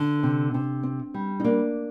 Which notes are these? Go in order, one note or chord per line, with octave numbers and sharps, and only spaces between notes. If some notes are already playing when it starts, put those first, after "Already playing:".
Already playing: D3
C3
C3
C4
G3
D#4
A#3 D4